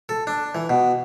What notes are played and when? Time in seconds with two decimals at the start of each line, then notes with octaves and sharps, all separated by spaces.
0.09 A4
0.27 D4
0.55 E3
0.70 B2